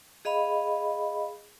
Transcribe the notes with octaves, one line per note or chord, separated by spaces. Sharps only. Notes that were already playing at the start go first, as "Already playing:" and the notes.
G#4 D#5 F5 B5